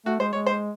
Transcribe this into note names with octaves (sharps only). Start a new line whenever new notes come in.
A3 F#4
G#3 C5
G#3 C#5
C5